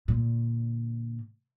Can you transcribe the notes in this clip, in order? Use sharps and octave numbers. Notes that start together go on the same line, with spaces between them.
A#2 D3